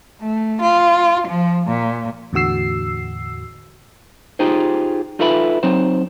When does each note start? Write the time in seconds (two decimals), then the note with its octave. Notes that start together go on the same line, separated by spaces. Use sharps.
0.21 A3
0.62 F4
1.28 F3
1.67 A#2
2.33 E2 A2 D3 F#4 E6 C7
4.39 D#4 F4 G4 G#4 C5
5.19 D#4 F4 A4 B4 E5 B5
5.63 F#3 C4 D#4 C5